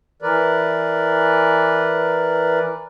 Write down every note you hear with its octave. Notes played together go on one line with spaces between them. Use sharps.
E3 A#4 B4 D5